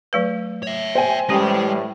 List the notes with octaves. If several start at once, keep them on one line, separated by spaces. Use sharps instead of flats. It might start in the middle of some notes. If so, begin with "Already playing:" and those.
F#3 A3 B4
C#5 E5
C5 G5 G#5
A2 E3 G3 G#3 C#4 G4